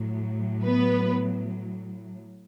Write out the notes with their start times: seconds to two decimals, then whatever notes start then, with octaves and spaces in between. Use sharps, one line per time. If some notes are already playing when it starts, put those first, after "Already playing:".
Already playing: A2 F#3
0.65 B3 B4